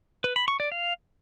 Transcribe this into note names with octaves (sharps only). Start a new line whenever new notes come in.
B4
B5
C#6
D5
F5